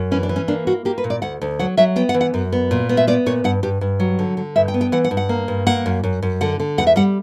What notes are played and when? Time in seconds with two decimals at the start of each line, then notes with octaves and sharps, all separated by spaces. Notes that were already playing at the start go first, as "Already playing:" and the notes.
Already playing: F#2
0.11 E3 C#4
0.23 D4
0.29 E3
0.36 C#4
0.48 A#3 D4
0.67 A#3 F#4
0.85 A#3 G4
0.98 B4
1.04 A#2
1.10 D5
1.22 D2 F#5
1.42 D2
1.59 F#3 F#5
1.77 F#3 E5
1.96 B3 G5
2.09 F#5
2.14 E3
2.21 F#5
2.34 F#2
2.52 B3
2.71 A#2
2.89 B3
2.97 E5
3.07 B3 D5
3.26 A#2 C#5
3.44 G2 F#5
3.63 G2 G4
3.81 G2
4.00 F#3
4.19 D3
4.37 D3
4.56 G2 E5
4.68 G5
4.74 B3
4.81 G5
4.92 E3 F#5
5.04 F#5
5.11 G2
5.17 F#5
5.29 A#3
5.48 G2
5.66 A#3 F#5
5.86 F#2
6.03 F#2
6.22 F#2
6.41 D3 F#5
6.60 D3
6.78 E2 F#5
6.87 E5
6.96 G3 F#5